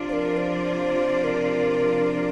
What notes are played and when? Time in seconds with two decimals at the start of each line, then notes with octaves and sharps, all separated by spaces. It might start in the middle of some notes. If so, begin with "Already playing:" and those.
Already playing: C3 F3 D4 F4 D5
0.09 C5
0.13 A#4
0.37 C5
1.24 A#4